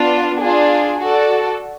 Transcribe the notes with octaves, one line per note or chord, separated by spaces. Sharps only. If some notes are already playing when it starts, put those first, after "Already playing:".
Already playing: B3 D4 F4
D4 F4 G#4
F#4 A4 D5